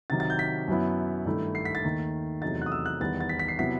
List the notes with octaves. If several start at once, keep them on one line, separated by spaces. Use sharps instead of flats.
C3 D#3 F#3 A6
A6
G6
B6
F#2 F#3 B3 E4
G2 D#3 A3 E4
C7
B6
A6
D#2 D#3 A3
E2 C3 F#3 A3 D#4 A6
F#6
D#6
E6
F#6
E2 D#3 G3 B3 A6
A6
B6
B6
C7
C3 F#3 B3 E4 B6